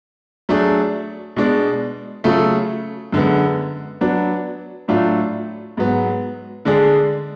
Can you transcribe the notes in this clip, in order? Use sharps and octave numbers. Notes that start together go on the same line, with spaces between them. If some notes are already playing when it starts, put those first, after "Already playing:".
F#3 A3 D4 G#4
B2 G#3 D4
C#3 F#3 A3 F4 A4
F#2 D3 G#3 B3
F#3 B3 D4
A2 F#3 A3 D4 F4
G#2 F#3 B3
D3 G#3 D4 G#4